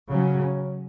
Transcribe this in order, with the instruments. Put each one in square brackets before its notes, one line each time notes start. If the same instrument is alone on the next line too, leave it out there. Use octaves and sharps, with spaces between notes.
[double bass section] C#3 F#3 C#4